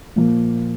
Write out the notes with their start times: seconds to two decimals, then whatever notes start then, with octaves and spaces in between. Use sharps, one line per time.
0.16 A#2 F3 A#3